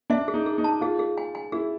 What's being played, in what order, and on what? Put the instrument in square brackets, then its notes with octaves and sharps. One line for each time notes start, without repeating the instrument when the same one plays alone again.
[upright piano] D4 [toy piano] E5
[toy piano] G#4
[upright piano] D#4
[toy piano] G#4
[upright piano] D#4
[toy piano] A5
[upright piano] F4 [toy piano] G#4
[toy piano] G#4
G#5
G#5
[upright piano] E4 [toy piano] G#4